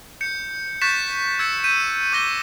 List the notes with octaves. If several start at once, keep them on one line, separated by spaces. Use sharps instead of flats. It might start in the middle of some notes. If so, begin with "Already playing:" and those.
G6 C#7
C#6 F#6 G6 A6 B6 E7
E6 G#6 A6 C#7
G6 B6 D#7
D6 G6 A#6 G7